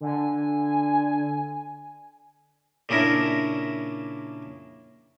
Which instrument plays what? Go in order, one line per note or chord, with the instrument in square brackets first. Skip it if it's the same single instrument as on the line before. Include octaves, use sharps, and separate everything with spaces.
[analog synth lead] D3 [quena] G#5
[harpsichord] A#2 C#3 D4 E4 A#4